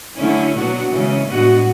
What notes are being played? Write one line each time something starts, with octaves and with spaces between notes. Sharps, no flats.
D3 F#3 A3 C#4 E4
B2 F#3 B3 D4 F#4
C#3 E3 G#3 C#4
A2 G#3 B3 D4 F#4